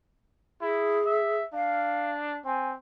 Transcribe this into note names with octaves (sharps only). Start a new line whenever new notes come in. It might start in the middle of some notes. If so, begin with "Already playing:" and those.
E4 G#4
E5
D4 F5
C4 G#5